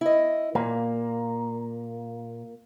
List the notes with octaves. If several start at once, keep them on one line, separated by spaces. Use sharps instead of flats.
E4 D#5
A#2 A#3